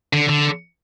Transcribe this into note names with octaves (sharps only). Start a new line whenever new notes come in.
D3
D3